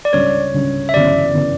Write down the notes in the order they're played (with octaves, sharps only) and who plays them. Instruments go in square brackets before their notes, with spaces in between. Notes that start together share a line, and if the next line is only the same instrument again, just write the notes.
[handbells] D5
[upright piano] C#2 C#3 G3 D4 [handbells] C#5
[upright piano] C#2 C#3 G3 D4
[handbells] E5
[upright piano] G1 F#2 C#3 E3 B3 [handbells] D5
[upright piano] C#3 E3 B3